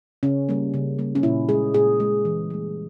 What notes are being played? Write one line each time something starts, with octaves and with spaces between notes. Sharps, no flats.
C#3 C#4
G3 A#3
C#3
G3 A#3
C#4
A#2 E4
G#3 G#4
A#2 G#4
G#3
E3
G3 A#3